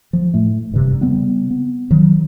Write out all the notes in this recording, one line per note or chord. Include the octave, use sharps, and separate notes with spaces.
F3
A2 A3
E1 G2 C3
C#3 G3 B3 C4
B3
D#3 F#3